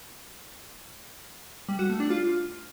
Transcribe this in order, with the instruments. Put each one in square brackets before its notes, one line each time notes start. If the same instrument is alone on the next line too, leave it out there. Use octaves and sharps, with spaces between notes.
[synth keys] G3
F#4
A3
D4
F4